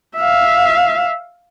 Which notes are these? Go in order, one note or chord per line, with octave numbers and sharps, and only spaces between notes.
E5 F5